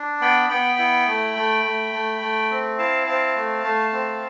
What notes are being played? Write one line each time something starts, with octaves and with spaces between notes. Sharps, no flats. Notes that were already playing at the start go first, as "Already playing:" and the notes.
Already playing: D4
B3 G5 B5
B3 G5 B5
E4
A3
A3
A3
A3
A3
C4
E4 F5 A5
C4 F5 A5
A3
A3
C4